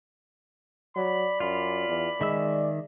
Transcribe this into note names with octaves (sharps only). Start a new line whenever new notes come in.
F#3 D5 B5
F#2 F4 B5
E2
D#3 G#3 E5 E6